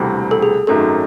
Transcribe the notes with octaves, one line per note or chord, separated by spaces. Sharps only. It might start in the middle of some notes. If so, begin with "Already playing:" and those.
Already playing: E1 D2 C3 E3 G3
A4
G#4
G#1 F#2 D#3 F#3 A3 A4